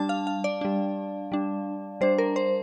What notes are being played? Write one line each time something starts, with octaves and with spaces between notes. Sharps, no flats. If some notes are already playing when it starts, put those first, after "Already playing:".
Already playing: G3 D4 A5
F5
F5
D5
G3 D4
G3 D4
G3 D4 C5
A#4
C5